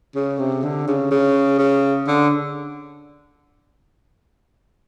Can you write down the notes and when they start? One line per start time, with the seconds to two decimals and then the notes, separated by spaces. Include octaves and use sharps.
0.15 C#3
0.39 C3
0.63 D3
0.88 C#3
1.11 C#3
1.59 C#3
2.07 D3